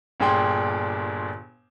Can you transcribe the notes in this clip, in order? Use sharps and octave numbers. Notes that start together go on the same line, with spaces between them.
G1 A#2 D4 G#4 G5 C6